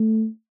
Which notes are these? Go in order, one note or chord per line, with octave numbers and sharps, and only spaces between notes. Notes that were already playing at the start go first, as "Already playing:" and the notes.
Already playing: A3